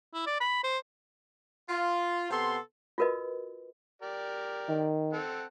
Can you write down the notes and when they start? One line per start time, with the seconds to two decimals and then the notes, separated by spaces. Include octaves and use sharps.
0.14 E4
0.27 D5
0.40 B5
0.64 C5
1.69 F4
2.31 C3 B3 A4 C6
2.98 F4 F#4 A#4 B4 D#5
4.02 G4 A#4 D5
4.69 D#3
5.13 C4 A4 F#5